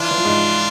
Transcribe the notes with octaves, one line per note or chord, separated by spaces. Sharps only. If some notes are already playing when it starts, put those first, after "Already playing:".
Already playing: E3 D4 E4 F4
E3
F3
G#2 G#3